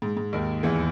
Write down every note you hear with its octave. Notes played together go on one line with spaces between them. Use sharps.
G#2
G#2
D#2 D#3
E2 E3